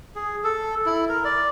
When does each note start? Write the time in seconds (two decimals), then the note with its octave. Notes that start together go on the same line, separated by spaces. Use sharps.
0.15 G#4
0.44 A4
0.86 E4
1.09 A#4
1.25 D5